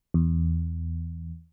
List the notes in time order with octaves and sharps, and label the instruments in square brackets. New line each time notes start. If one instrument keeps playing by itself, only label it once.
[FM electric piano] E2